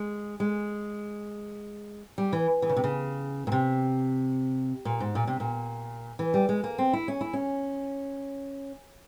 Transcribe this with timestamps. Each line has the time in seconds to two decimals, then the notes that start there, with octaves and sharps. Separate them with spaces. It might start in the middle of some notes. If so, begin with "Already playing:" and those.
Already playing: G#3
0.40 G#3
2.18 G3
2.33 E3
2.62 E3
2.69 C#3
2.76 C3
2.84 C#3
3.47 A#2
3.52 C3
4.85 A#2
5.00 G#2
5.15 A#2
5.27 C3
5.40 A#2
6.19 E3
6.34 G3
6.49 G#3
6.64 A#3
6.78 C4
6.93 E4
7.08 C#4
7.21 E4
7.33 C#4